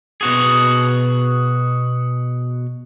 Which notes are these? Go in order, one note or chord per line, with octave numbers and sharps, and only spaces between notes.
B2 F#4 G#4